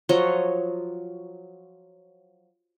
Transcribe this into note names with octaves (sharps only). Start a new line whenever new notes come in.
F3 F#3 C#5 D#5